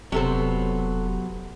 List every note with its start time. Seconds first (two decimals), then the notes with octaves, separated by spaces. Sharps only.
0.12 E1 C3 F#3 B3 A4 C5